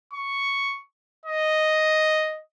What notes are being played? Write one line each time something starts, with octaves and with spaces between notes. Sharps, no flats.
C#6
D#5